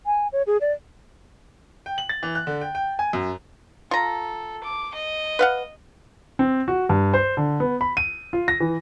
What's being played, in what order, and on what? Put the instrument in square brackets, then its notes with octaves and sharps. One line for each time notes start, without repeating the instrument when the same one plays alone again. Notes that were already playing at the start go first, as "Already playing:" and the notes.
[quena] G#5
C#5
G#4
D5
[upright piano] G5
F#7
A6
E3
F#6
D3
G5
G5
G#5
F#2
[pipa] F4 A#5 [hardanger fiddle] A4
[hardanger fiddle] D6
D#5
[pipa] B4 F5 F#5
[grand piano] C4
F#4
G2
C5
D3
B3
B5
D#7
F4
A#6
E3